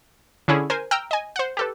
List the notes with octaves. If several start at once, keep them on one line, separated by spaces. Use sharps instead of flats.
D3 C#4 E4 G#4
A#4 C5 G#5
G5 A#5 E6 F6
D#5 G#5
C5 F#5
G4 A4 B4